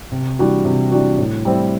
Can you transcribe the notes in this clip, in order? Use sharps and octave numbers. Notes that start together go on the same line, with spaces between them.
C3
E3 G3 D4 F#4
C3
E3 G3 D4 F#4
A2
G3 C4 E4